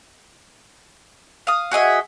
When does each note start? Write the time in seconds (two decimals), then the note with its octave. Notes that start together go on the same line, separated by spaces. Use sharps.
1.47 F5 D#6
1.71 F#4 G#4 D#5 E5